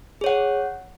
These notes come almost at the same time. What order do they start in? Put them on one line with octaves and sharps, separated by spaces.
G#4 C#5 F#5